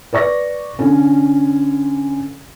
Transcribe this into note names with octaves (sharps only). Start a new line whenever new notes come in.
B4 D5 C#6 A#6
D3 C#4